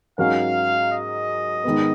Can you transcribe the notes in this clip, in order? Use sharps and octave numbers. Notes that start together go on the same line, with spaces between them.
G#2 F#3 C#4 F#4 A#4 F5
D#5
G#2 D#3 G#3 B3